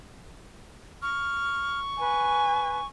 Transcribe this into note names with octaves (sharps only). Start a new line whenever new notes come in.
C#6 F6
B4 G#5